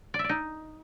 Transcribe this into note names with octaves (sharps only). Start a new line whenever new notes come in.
D5
E5
D5
D#4